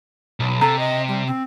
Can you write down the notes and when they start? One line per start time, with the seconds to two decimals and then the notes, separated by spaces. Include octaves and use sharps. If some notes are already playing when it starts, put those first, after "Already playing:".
0.40 B1
0.61 C3 A4 A#5
0.79 D#5
1.08 G3
1.27 C4